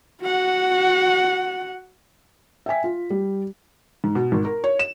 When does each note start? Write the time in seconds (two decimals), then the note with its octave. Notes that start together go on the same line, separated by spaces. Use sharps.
0.22 F#4 F#5
2.66 E5 G5 G#5 B6
2.84 F4
3.10 G3
4.04 G#2
4.15 B2
4.32 G#1
4.45 A#4
4.64 C#5
4.79 E7